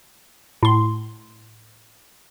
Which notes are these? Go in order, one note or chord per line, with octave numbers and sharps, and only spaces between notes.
A2 C6